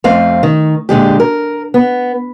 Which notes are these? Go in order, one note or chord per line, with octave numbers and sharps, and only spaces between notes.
F2 A3 C4 F5
D#3
A#2 D3 G#3 G4
A#4
B3